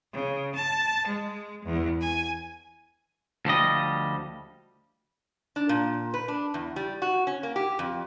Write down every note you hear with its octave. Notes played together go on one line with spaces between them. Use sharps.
C#3
A5
G#3
E2
G#5
D2 F3 G3 D#5
D4
A#2
B4
D4
E2
G3
F#4
C#4
A#3
G4
F2